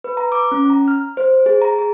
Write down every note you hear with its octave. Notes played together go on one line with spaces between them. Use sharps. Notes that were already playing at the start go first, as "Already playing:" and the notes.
B4
A#5
D6
C#4
A#5
F6
C5
G#4
A#5
G#4